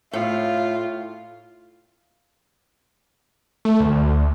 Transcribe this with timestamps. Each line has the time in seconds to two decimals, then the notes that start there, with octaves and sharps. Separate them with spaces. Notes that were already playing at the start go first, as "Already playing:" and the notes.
0.13 A2 F4
3.65 A3
3.80 D2